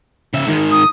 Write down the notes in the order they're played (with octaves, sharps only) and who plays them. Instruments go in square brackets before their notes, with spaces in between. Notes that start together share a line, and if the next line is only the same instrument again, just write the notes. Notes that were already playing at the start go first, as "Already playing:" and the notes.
[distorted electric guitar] C#3 E5
G#2 D#3
[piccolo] D#6